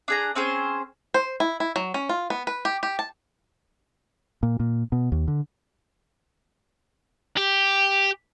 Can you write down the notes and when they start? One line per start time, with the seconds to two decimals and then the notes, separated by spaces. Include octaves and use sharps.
0.08 D4 G#4 A#5
0.35 C4 C#4 G#4 C5
1.14 C5
1.40 E4
1.60 E4
1.76 F#3
1.94 C#4
2.09 F4
2.30 B3
2.47 B4
2.65 G4
2.83 G4
2.99 A5
4.43 A#2
4.60 A#2
4.92 B2
5.12 D#2
5.28 D3
7.37 G4